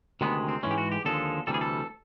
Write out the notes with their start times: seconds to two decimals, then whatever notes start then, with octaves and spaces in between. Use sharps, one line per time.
0.21 D2 C3 D#3 G#3 B3
0.48 C4
0.63 G#2 E3 G#3 C#4
0.71 G4
0.78 F#4
0.92 G4
1.05 D#2 D3 F3 G#3 A4
1.47 D2 C3 E3 G3 A4
1.54 G#4
1.61 A4